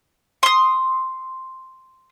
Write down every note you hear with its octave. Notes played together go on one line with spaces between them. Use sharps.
C6 D#6